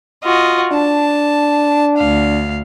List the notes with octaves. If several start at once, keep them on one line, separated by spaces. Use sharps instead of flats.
F4 F#4 D#5
D4 A5
D2 F5